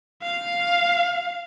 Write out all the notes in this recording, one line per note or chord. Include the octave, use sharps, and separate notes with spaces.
F5